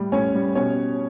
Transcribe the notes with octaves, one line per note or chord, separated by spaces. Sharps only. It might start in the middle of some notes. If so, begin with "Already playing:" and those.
Already playing: A2 G3
A2 C#4 C#5
G3
B2 C#4 C#5